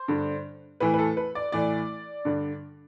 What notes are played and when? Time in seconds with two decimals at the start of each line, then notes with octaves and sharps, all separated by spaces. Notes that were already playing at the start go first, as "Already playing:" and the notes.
Already playing: C5
0.08 G2 D3
0.80 A2 E3 B4
0.94 B4
0.99 A4
1.17 B4
1.35 D5
1.52 A2 E3 D5
2.25 G2 D3